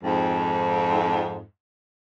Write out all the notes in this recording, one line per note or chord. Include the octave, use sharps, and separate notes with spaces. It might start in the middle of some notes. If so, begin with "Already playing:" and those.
F2 G#2